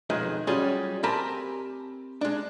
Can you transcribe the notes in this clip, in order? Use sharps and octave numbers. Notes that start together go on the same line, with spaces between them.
B1 F2 D#3 G#3 B4
F#3 G3 C#4 F4 G#4
C4 G4 A#4 G#5 A5 B5
G#3 D4